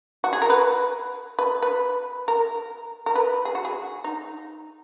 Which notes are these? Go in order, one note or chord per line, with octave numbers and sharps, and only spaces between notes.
F#4
G#4
A#4
B4
B4
B4
A#4
A#4
B4
G#4
F#4
G#4
D#4